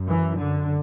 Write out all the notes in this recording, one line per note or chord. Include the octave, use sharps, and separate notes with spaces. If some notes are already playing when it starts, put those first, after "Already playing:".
Already playing: F#2
E3
D3